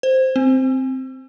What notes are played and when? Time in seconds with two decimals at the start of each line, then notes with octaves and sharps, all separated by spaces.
0.03 C5
0.36 C4